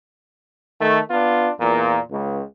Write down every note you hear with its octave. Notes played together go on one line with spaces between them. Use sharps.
D#3 A3
B3 D4 F4
E2 A#2
C#2